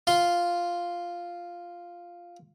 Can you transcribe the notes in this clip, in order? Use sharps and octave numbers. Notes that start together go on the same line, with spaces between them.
F4 C6